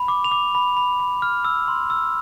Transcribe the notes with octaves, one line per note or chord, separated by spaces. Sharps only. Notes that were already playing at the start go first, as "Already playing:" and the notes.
Already playing: B5
D6
F7
D6
B5
B5
B5
F6
E6
C6
E6